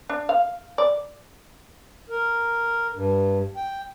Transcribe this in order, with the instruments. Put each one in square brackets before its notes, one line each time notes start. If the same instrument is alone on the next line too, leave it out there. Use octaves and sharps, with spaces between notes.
[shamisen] D4
F5
D5
[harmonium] A#4
G2
G5